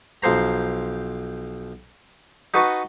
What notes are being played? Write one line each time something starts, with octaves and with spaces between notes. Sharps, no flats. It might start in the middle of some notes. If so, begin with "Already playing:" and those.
B1 F3 C5 A#5
D#4 F#4 B4 D#5 A5 C#6